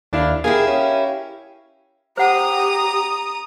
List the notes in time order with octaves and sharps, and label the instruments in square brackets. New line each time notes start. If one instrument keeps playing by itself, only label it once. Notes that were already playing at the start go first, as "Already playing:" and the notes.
[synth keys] D#2 E4 F5 [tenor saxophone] D4
[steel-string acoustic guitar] E4 G4 A#4 [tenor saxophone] G#4 [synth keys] F5
[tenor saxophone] C#4
[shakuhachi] G4 [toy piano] C5 F#5 [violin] A#5 D#6